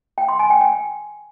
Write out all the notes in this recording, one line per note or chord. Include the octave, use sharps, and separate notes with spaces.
G5
C6
G#5
G5
G5